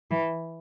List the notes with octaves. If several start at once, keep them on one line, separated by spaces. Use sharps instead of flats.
E3